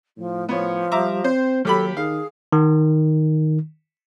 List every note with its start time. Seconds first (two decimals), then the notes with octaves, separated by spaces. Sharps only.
0.17 A2 F3
0.49 F3 B3 C#5
0.92 G3 E5 A#5 D6
1.24 C4 C5
1.65 D#2 F#3 G4 A4 B5
1.97 D#3 G#4 F5
2.52 D#3